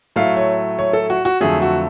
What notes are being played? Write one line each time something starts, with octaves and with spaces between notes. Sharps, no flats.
A2 F#3 A3 F5
C#5
C#5
A4
F#4
F#4
F2 D3 F#3 A3 G#4
F#4